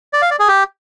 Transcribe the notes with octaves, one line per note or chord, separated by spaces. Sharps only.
D5
F5
D5
G#4
G4